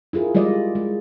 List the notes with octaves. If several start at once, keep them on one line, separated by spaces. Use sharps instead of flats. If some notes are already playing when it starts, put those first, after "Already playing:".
E4 F4 G#4 A#4
G3 G#3 F4 D5 D#5
G#3